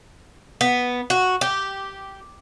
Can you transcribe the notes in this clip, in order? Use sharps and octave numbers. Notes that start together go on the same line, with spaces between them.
B3
F#4
G4